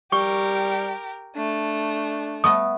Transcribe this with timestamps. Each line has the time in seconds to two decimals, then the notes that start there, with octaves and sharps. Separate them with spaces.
0.12 G3 G4 A#4 C#6
1.36 A3 D4
2.44 A3 B3 D#5 D#6